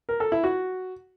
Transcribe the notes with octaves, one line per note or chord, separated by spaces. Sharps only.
A#4
A4
E4
F#4